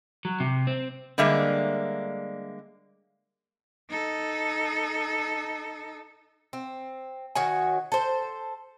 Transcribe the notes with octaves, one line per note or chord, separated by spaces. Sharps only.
F#3
C3
C4
D3 G3 G#3 A#3 E5
D#4 A4
C4
D#3 F#4 C#5 G#5
A4 C5